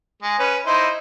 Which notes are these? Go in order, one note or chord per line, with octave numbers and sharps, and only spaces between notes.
G#3
C#4 B4
D#4 E4 C5